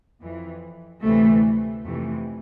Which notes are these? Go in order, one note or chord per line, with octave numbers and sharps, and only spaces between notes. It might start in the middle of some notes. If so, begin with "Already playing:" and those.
F2 E3
D2 C3 E3 A3
F2 C3 E3 A3